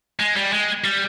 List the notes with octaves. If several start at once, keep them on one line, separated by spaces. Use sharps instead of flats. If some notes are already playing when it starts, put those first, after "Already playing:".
G#3
G3
G#3
G3